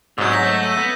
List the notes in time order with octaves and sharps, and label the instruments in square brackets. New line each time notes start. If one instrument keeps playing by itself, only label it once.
[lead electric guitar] C2 G#3 [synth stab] G#2 F#3 [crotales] E6 G6
[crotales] G6 A#6 B6
[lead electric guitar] A3
[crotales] D#7
[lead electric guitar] B3